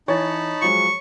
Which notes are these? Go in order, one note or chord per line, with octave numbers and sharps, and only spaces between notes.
E3 D#4 C#5 A5 B5 A6
F3 F#3 G#3 C#6